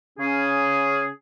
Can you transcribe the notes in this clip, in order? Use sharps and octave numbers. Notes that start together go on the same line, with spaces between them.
C#3 C#4 G#4